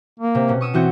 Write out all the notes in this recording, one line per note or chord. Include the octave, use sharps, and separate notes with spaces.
A#3
C3
B2 C#4
C#6 D#6 E6
E3 C4 F#4 G6